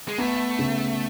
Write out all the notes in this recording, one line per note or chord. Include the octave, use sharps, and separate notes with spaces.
G#3
A3 B3
C#3